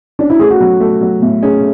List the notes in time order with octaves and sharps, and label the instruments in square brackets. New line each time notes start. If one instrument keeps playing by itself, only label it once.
[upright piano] C#4 [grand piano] D4
[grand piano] E4
[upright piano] A3 [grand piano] G#4
[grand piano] F#4
[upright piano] F#3
A3
F#3
A2
[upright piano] C#4 [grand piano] G#4